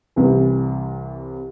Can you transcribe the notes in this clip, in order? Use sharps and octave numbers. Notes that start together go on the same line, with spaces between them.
C2 C3 E3